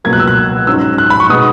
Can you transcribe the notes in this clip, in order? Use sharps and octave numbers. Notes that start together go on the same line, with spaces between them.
C#2 B2 F#3 A#3 G#6
F#6
E6
F#6
G#2 F#3 C#4 E6
F#6
B5
C#6
B2 G#3 B3 D#4 D#6